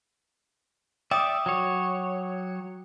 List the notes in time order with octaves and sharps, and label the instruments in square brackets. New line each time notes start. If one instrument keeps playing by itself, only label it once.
[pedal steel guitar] D5 E5 [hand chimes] G5 D6 D#6
[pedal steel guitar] F#3 C#5